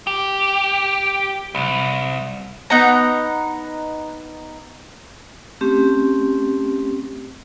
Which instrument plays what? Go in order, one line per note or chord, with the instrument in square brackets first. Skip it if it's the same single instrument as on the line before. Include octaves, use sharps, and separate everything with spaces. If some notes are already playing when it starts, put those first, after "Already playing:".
[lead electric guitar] G4
C2
[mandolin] B3 D#4 F#5 A#5
[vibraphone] A3 C4 C#4 G4